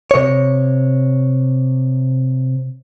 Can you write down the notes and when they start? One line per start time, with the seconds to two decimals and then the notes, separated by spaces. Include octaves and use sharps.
0.11 C3 C#5